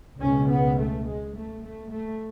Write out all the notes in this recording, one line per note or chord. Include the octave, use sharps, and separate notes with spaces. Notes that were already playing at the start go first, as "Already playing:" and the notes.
C#2 B2 C#4
B3
A3
G#3
A3
A3
A3